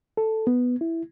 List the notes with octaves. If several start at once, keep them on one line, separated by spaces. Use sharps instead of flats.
A4
B3
E4